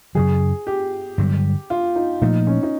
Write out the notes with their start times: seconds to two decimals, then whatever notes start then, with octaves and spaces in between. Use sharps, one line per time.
0.15 F#2 C#3 F#3 G#4
0.67 G4
1.18 G2 D3 F#3
1.70 F4
1.96 D#4
2.22 A#2 F3 A3 D#4
2.47 C#4
2.63 D#4